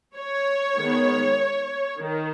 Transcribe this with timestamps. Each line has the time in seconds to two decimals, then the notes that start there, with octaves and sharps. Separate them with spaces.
0.16 C#5
0.78 D#3 G#3 B3
2.02 D#3